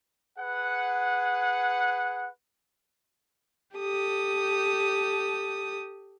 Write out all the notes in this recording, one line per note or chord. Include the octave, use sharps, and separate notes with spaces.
G#4 B4 F#5
G4 A4 D#6